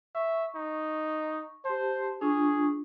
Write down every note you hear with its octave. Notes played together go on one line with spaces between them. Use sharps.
E5 C#6
D#4
G4 C5 A5
D4 F4 G#4 C#6